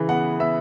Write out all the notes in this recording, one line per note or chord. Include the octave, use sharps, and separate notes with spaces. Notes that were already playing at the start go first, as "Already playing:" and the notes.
Already playing: C#3 E3
B3 F#5
B3 E5